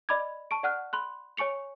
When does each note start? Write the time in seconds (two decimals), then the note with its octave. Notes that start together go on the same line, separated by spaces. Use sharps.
0.09 D5 D#5 B5 D6 G#6
0.51 A5 C#6 D7
0.63 D5 F#5 F6 F#6
0.93 B5 C6 F#6
1.37 C#5 G#5 C#6 C#7 F7